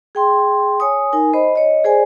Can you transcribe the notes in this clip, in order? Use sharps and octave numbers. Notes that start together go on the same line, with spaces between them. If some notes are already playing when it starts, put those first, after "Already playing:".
G#4 G5 C6
C#5 G#5 D#6
D#4 A#4 G#5
C5 D#5 B5
C#5 D#5
G#4 C5 D5 G#5